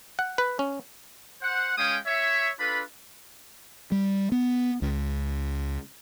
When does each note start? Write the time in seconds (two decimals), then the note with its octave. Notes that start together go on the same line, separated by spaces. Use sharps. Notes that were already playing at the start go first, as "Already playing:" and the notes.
0.19 F#5
0.38 B4
0.59 C#4
1.41 C5 F#5
1.77 G#3 C#4 F5 G5 D#6
2.06 C#5 E5
2.59 D4 F4 A4 B4 B5
3.92 G3
4.32 B3
4.82 C#2